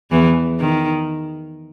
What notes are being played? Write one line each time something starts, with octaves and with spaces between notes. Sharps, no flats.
E2 E3
D#3